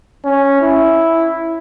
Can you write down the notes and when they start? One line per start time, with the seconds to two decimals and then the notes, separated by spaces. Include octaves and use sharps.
0.25 C#4
0.61 E4